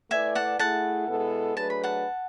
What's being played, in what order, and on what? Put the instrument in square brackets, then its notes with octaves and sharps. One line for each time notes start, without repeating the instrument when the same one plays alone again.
[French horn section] A3 E4 B4 D5 [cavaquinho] E5 G#5
[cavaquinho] F#5 A5
[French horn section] A3 E4 G#4 [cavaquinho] F#5 A5
[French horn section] B2 G#3 B3 E4 A4
[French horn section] F#3 A3 D4 G#4 B4 [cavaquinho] A5
[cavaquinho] B5
F#5 A5